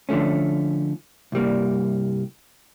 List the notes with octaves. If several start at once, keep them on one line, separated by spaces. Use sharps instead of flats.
D3 F3 A3 C#4
C2 G2 G3 A#3